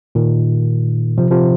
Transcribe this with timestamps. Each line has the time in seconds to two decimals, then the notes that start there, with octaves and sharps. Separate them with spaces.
0.15 A#2 D#3
1.18 C3 F3
1.31 C3 F3